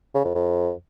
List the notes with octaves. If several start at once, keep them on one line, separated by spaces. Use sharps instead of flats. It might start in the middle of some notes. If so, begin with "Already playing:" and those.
C#3
F2
F2